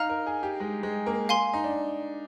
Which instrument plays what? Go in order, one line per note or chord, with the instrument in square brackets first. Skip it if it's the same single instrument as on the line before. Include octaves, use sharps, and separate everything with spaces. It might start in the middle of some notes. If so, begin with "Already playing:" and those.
Already playing: [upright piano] D#4 [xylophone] F5 A#5 F6
[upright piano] A#4
G#4
G4
G#3
G#3
A#3
[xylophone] F5 G#5 C6
[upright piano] D#4
D4